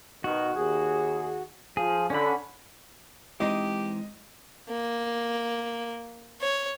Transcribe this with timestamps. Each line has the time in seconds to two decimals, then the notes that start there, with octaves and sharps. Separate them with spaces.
0.24 B2 D#3 F#4
0.56 D#2 G#4
1.77 F3 G#4
2.10 D3 C#4 B5
3.40 E3 G#3 C4 D#4 G4 D#5
4.69 A#3
6.41 C#5